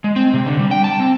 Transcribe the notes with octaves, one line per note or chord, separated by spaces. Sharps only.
G#3
C4
C3
D3
G3
G5
A5
C4